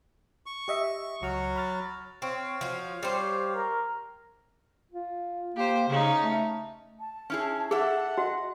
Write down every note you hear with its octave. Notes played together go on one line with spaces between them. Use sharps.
C#6
G4 D#5 E5
C#2 F#3 F#4 C#6 F6
B5 F6 A6
C4 C#5 F5
F3 F#4
G3 G4 C5
A#4
F4
A#3 G4 C5
C#3 C#4 D#4
A3
A5
C#4 E4 G#4
G#4 A4 E5 F#5
F#4 D#5